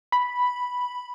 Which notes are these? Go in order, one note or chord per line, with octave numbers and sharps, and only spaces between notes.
B5